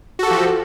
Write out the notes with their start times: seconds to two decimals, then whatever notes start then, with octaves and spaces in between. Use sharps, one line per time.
0.19 F#4
0.23 A4
0.27 G4
0.31 F3